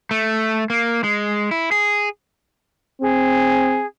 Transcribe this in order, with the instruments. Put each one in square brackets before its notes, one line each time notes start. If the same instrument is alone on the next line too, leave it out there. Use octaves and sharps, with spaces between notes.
[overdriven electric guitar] A3
A#3
G#3
E4
G#4
[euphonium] C4 [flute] G#4